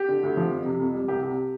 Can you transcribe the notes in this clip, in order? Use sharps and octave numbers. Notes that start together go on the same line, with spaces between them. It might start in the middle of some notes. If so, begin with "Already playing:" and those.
Already playing: G4
D3
D2
F3
F2
C3
F2
G3
C2 G4
C3 G4